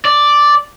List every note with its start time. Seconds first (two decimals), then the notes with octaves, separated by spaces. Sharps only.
0.05 D5